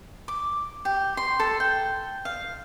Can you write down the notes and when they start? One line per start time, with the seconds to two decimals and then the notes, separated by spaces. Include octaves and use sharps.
0.28 D6
0.85 G4
1.17 C6
1.39 A4
1.60 G5
2.25 F5